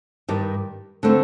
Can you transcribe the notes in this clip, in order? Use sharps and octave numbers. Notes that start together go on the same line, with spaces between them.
G2 D#3 G3
D3 A3 C4